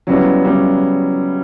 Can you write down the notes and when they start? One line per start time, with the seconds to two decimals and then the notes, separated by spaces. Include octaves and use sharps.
0.07 C#3 F#3 G3 B3 E4
0.44 C#3 G3 B3 E4